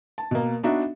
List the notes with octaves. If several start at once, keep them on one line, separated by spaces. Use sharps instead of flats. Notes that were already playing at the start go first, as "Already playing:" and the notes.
A5
B2 A#3
B3 D4 D#4 F#4 E5